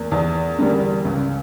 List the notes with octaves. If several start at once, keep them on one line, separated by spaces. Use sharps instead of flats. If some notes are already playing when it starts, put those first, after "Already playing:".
Already playing: E2 A#3
E2
D3 G3 A#3
C#2